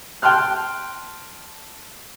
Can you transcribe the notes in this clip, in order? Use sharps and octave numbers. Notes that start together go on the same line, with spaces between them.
G5 A5 C6 F6 F#6